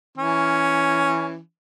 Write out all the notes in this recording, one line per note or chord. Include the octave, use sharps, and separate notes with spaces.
E3 C#4